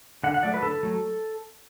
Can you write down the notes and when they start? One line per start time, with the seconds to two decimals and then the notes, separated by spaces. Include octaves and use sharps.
0.24 D3 F#5
0.34 F#5
0.43 F#3 A3 D5
0.54 B4
0.62 D3 A4
0.83 F#3 A3